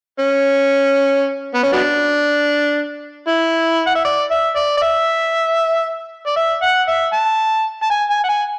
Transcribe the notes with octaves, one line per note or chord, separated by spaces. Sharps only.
C#4
B3
C#4
F#3 B3 D4
E4
F#5
E5
D5
E5
D5
D5
E5
D5
E5
F#5
E5
A5
A5
G#5
G#5
F#5
G#5